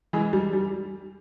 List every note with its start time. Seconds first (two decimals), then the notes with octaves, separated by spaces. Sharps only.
0.13 E3 G#3
0.33 G3
0.53 G3